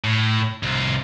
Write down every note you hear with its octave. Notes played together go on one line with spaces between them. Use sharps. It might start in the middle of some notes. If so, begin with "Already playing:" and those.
A2
C2 F4